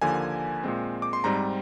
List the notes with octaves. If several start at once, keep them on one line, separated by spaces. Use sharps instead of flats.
D#2 D3 F3 A#3 G#5
A#2 G#3 C4
D6
C6
G#2 G3 C4 A#5